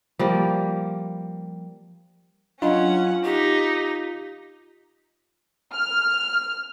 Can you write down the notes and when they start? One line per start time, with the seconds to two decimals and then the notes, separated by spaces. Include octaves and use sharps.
0.19 F3 G3 A#3
2.62 F#3 C#4 D4 F4 D#5 F#5
3.25 D#4 G4
5.74 F6